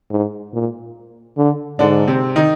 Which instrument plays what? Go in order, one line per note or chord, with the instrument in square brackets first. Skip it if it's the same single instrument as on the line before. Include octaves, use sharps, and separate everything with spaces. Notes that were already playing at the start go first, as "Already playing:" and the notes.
[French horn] G#2
A#2
D3
[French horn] G#2 [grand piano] D3 D4
[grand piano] C3 C4
D#3 D#4